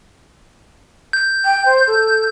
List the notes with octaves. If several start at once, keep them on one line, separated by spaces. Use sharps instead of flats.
G6
G5
C5
A4